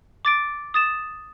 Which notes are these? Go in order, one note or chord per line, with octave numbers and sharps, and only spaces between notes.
D6 A6 D7
D#6 A6 E7